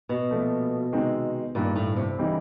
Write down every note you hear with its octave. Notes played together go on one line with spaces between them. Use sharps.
B2
A#2 F3 A3
C3 D#3 G#3 C4 D#4
G2 A#2 D#3 G3
A2
C3
C#3 E3 G3 C4 D#4